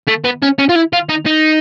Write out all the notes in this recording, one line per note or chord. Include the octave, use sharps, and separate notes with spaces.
A3
B3
C#4
C#4
F4
E4
F4
D#4
D#4